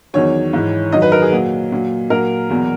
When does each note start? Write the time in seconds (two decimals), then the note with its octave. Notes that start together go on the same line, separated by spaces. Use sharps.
0.13 E2 D#3 F#3 C#5
0.53 G#2 E3
0.92 F#2 D#3 F#3 D#5
1.02 B4
1.12 A#4
1.22 G#4
1.32 A#2 F#3
1.72 A#2 F#3
2.10 A#2 F#3 A#4
2.50 E2 B2 F#3